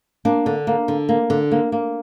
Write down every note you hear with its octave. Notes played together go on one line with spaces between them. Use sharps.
A#3 D4
D3
A#3
D3
A#3
D3
A#3
A#3